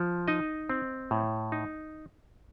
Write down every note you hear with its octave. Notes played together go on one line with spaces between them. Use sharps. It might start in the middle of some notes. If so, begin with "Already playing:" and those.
Already playing: F3
D#4 D#5
C4
A2
D#4